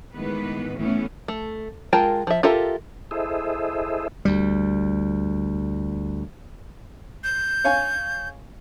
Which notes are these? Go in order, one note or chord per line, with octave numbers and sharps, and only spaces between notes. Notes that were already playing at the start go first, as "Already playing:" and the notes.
A2 D#3 E3 G#3 B3 B4
E3 A3 B3 C#4 E4
A3
G#3 F4 A#4 G5 A5
F3 E5
F4 G4 A4 A#4 E5
E4 G#4 A4 C5 D#5 E5
D2 G3
G6
C#5 F5 G#5